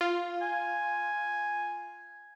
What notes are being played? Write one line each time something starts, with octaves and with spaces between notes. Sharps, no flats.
F4
G#5